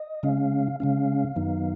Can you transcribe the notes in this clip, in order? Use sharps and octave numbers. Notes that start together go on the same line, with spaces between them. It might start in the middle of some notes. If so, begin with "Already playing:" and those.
Already playing: D#5
C#3 G#3 C#4 F5
C#3 G#3 C#4 F5
F#2 D#3 F#3 B3 D#4